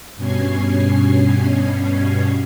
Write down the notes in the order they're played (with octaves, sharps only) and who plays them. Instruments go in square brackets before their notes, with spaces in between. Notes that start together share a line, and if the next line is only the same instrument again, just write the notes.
[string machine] G2 B2 C#4 G#6 C7